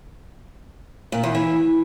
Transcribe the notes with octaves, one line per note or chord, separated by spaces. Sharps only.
A#2
E2
E3